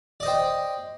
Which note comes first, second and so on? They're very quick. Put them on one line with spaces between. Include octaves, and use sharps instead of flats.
D5 D#5 C5 G5